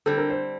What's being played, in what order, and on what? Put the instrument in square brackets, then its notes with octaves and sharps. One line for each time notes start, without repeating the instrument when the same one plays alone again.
[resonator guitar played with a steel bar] D3 G3 C4 [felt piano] A4
[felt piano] A#4
C5